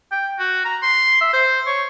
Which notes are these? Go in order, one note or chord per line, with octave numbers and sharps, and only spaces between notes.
G5
F#4
A#5
C6
E5
C5
C#5